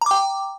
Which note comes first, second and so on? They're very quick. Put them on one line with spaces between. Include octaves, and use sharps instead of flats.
A#5 D6 G5